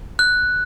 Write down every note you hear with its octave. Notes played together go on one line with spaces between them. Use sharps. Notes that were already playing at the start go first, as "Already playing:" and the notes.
F#6